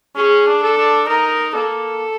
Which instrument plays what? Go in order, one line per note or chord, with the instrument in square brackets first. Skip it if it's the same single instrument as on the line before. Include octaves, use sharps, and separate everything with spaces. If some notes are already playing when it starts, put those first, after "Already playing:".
[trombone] C#4 [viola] G#4
[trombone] D4
[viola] A4
[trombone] D4
[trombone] D#4 [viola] A#4
[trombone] A#3 [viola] A4